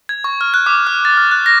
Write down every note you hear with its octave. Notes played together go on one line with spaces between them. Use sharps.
G#6
C#6
F6
F#6
D6
F6
A6
F6
F#6
A#6